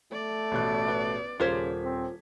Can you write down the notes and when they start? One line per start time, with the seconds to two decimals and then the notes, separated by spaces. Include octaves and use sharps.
0.12 A3 D5
0.52 A1 B2 F#6
0.88 B3
1.40 D#1 C#3 F4 A#4 C5 G#6 B6
1.83 C4